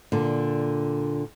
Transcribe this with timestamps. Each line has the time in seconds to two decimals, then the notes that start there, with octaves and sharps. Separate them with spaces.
0.12 A#2 D3